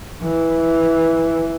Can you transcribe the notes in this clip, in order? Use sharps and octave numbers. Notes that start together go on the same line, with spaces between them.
E3